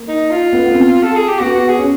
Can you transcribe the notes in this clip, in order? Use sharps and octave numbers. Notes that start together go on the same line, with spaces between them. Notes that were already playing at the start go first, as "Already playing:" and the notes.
Already playing: A#3
D#4
F4
B3
B3
C4
A4
G#4
G4
B3 F#4
F#4
G#4
C#4